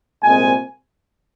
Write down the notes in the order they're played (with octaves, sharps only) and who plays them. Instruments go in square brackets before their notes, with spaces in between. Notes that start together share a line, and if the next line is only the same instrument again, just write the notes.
[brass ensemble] C2 A#2 G#3 C4 G#5